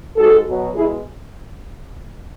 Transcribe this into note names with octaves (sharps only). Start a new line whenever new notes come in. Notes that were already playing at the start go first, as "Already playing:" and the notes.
G#2 G#3 F#4 A4
B2 F#3
B2 G#3 E4 G#4